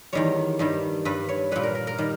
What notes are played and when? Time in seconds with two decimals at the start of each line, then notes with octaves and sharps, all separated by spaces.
0.13 E2 D#3 G3 C#5
0.59 G2 D#3 G3
1.05 G2 G3 B4
1.29 C#5
1.51 A#2 G3 B4
1.63 A#4
1.75 A#4
1.87 A#4
1.98 D#3 G3